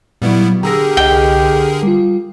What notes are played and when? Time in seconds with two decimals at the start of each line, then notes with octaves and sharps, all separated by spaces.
0.22 A#2 F#3 G3 B3 E4
0.63 D3 G4 G#4 A#4 A#5 E6 A#6
0.97 C2 D#5 G5
1.83 G3 F4